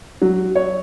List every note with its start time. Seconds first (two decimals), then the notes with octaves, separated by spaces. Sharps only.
0.22 F#3
0.55 C#5